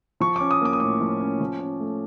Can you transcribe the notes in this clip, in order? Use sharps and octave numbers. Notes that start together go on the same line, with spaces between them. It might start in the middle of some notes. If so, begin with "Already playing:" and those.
F3 C#6
C#4 D6
D#6
A#3 D6
D#6
A2 D6
F3
C#4
F3
C#4
A3